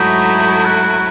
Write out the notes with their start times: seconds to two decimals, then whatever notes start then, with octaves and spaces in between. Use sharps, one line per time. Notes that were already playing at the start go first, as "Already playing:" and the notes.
Already playing: G#2 F#3 A3 D#4 E4
0.65 F#4